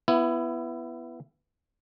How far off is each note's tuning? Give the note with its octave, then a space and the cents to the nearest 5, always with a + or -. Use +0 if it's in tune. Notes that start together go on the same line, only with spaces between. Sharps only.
B3 +0 E4 +20